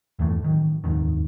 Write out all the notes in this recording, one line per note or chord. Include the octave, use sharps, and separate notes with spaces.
E2 G2 E3 A3
A1 D#3 F#3
D#1 F2 G#2 D#3